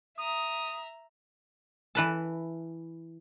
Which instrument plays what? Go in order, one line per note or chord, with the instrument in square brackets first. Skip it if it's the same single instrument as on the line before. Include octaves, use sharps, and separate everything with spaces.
[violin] E5 A#5 [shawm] D#6
[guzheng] E3 B4 A5